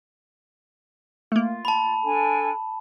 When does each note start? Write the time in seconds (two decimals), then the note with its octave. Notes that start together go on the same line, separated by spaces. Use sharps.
1.32 A3 A#3 F4
1.65 A5 B5
2.03 D4 A4 G#5